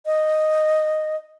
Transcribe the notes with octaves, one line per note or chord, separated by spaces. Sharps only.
D#5